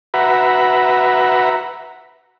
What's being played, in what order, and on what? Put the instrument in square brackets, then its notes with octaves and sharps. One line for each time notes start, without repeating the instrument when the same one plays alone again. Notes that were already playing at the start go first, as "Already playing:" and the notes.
[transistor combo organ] F#4 B4 E5 F#5 A#5 B5